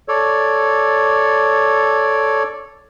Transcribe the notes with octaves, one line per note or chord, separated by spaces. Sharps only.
A4 C#5 D5